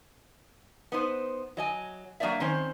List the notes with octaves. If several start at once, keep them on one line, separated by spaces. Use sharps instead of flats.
B3 D#4 C5
F#3 D#5 G#5
F#3 A#3 B3 D4 D5 E5
D#3 C4 C#4 C5